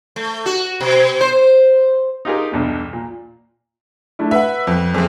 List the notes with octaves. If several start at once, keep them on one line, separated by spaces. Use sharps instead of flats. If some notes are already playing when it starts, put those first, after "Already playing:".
A3
F#4
B2
C5
D#4 F4 G4 G#4 A#4
B1 E2 G2
A#2
A3 D4 E4
B4 E5 F#5
F2
F#1 F2 G#4